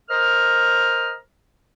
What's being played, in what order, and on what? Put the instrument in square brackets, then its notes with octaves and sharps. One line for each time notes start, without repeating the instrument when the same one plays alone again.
[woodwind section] A#4 C5 D#5 A#5 F6